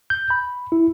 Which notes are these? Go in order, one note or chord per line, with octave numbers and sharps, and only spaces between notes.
G6
B5
E4